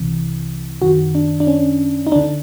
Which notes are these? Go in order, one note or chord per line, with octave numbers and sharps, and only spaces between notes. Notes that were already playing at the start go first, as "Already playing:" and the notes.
Already playing: C2 C3 E3
F#2 D#3 F#4
D4
D4
C#4
D#4
D2 D3 D4